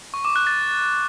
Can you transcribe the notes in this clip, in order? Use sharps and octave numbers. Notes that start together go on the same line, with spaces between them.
C#6
D6
F#6
A6